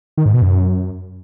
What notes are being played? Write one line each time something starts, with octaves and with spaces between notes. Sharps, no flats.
D#3
G#2
B2
F#2